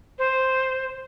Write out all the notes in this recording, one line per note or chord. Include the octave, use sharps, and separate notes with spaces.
C5